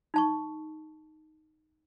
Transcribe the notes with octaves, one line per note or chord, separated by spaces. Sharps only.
D#4 A5 C#6